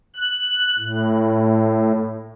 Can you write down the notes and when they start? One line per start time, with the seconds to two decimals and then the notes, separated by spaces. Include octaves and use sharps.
0.16 F#6
0.79 A2